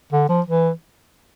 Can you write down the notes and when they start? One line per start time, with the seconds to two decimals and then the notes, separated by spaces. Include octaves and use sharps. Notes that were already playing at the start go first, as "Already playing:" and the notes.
0.12 D3
0.29 F3
0.46 E3